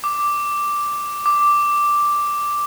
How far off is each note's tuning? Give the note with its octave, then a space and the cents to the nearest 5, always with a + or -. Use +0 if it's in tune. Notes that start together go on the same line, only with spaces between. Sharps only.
D6 +0
D6 +0